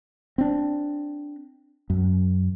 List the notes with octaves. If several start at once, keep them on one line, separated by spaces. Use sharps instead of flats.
C4 D4
F#2